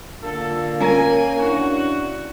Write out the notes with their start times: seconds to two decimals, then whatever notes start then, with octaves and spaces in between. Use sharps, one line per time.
0.22 D3 A#3 F4 A4
0.80 C#4 A#4 G#5
1.38 D4 E4 F#4